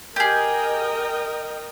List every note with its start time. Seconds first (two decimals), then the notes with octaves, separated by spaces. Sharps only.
0.16 G4 G#4 A#4 D#5 G5